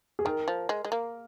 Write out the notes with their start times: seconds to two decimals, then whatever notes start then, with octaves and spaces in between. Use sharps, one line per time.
0.19 G#4
0.25 D#3 A#4
0.48 F3
0.69 G#3
0.85 G#3
0.92 A#3